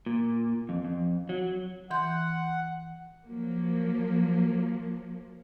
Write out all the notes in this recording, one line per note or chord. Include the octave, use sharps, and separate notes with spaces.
A#2
F2
F2
F#3
E3 F#5 C6 G6
F3 F#3 A#3